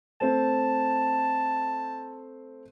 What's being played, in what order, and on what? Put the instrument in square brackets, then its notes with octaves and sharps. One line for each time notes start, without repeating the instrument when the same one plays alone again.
[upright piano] A3 C4 C5 [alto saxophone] A5